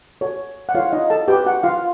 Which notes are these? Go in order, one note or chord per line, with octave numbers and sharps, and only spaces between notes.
F#4 A4 C#5
F#5
E4 F4 A4 C#5 F5
D#4 D#5
A4 A5
D#4 F#4 G4 B4 G5
F#4 F#5
F4 F5